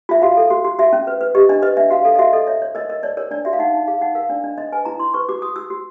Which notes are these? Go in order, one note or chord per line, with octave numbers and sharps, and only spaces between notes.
F4 E5
F#4 F5
A4
F#4
F#4
F#4 E5
C#4
B4
B4
G4 D#5
D4 D#5
B4 D#5
D4 E5
F#4 F5
A4 F5
D#5
F#4 E5
A4 D#5
C#5 E5
C#5
A#4 D#5
A#4 D#5
C#5 D5
A#4 C#5
D4 D5
F#4 E5
F5
D#4 F#5
D#4
G#4 F5
D#4 F#5
A#4 F5
D4 D5
D4 D#5
D4 D#5
B4 G#5
E4 A#5
E4 C6
B4 C#6
F#4 D6
F#4 D#6
F#4 E6
F#4